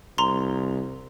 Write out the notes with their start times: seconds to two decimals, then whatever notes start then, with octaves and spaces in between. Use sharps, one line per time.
0.18 C2 A#5 C6